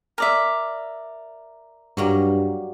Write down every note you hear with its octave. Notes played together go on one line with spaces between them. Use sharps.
A#4 D5 E5
G2 F#3 G3 A#3